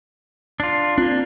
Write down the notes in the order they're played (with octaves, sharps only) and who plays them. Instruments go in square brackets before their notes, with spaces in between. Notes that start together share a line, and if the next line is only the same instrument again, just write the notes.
[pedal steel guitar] D4 F4
[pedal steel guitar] A#3 D4 [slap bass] C4 [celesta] F4